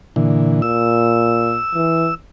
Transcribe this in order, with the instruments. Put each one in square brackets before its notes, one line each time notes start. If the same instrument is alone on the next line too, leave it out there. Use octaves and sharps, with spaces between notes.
[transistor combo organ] A#2 D3 E3
[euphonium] A#2 [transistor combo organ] E6
[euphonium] E3